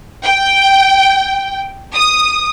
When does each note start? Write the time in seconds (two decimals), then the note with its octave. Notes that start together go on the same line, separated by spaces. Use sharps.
0.24 G5
1.95 D#6